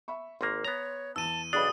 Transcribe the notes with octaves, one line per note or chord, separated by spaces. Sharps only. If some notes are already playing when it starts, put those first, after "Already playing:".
E5 B5 C#6
G#1 A#3 C6 C#6 A#6
B3 C#5 A#5
E2 A5 E6 D#7
B1 D4 F#4 G#4 D5 B5 D#6